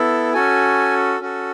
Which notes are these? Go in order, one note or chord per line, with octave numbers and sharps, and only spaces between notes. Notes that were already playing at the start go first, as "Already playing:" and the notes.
Already playing: B3 E4 A4
C#4 F#4 A4 G#5
C#4 F#4 A4